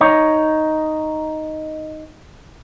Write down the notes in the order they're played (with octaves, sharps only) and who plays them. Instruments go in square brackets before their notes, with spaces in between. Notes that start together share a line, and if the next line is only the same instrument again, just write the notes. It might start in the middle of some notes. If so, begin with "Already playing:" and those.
[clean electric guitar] D#4 C#5